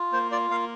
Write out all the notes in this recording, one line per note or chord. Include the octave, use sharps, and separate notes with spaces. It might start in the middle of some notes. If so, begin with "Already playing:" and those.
Already playing: F4
A#3 C5
F4 D5
A#3 F5